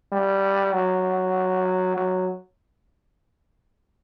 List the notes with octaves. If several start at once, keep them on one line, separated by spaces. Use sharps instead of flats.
G3
F#3
F#3